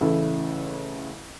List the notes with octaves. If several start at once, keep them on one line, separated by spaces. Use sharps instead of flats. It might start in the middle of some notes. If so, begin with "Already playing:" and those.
A1 C#3 E4 A4